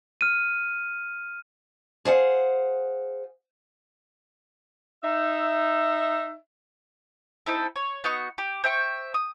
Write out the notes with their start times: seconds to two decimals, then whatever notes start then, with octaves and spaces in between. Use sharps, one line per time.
0.21 F6 D#7
2.05 G#4 C5 F5 F#5
5.03 D#4 E5
7.46 C4 D#4 E4 A4
7.76 C#5
8.04 B3 D#4 F#4 C#6
8.38 G4
8.64 C5 E5 G5 C#6
9.14 D#6